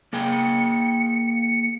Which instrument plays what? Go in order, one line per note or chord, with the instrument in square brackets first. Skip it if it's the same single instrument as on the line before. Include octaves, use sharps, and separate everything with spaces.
[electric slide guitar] A#3 G#4 G5 [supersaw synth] C#7